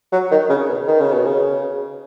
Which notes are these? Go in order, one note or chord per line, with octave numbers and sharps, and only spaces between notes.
F#3
D#3
C#3
B2
D#3
C#3
B2
C#3